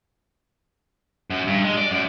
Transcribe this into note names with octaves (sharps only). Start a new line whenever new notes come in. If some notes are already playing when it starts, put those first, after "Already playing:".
F#2
G2
G#3
D5
F#2